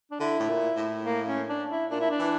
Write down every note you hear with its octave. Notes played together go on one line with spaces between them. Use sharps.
D4
D3 E4
A2
A#2
A2
A#3
C#4
D4
E4
A#2 D4
E4
D4
E3